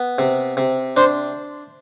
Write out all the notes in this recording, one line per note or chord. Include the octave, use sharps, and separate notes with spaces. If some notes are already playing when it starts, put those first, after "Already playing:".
Already playing: B3
C3
C3
D4 C5